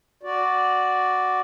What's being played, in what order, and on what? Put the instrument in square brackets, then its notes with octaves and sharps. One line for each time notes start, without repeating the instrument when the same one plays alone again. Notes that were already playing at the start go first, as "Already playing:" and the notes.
[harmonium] F#4 D5